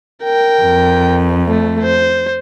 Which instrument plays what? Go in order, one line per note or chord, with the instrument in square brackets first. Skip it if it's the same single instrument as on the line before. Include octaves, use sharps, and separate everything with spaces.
[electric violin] A#4 G5
[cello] F2
[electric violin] A3
C5